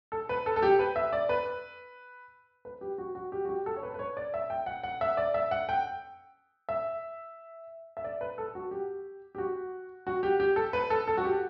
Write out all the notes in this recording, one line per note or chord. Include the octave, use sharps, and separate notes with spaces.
A4
B4
A4
A4
G4
B4
E5
D5
B4
B4
G4
F#4
F#4
G4
F#4
G4
A4
C#5
B4
B4
C#5
D5
E5
G5
F#5
F#5
E5
D5
E5
F#5
G5
E5
E5
D5
B4
A4
F#4
G4
G4
F#4
F#4
G4
G4
A4
B4
A4
A4
F#4
G4